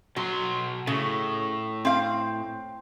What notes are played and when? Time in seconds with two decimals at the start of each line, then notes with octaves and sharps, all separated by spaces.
0.16 B2 F#3 C6
0.87 A2 C#3
1.85 C4 F5